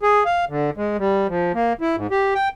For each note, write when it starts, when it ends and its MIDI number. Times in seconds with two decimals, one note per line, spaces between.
0.03 0.24 68
0.25 0.45 77
0.49 0.70 50
0.77 0.97 56
0.99 1.27 55
1.28 1.52 53
1.54 1.73 58
1.81 1.96 64
1.96 2.07 44
2.11 2.34 67
2.35 2.48 79